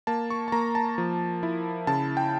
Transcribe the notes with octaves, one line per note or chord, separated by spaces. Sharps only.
A#3 A5
C#6
A5
A#3 A#5
A5
F3
E4
C#3 A5
G5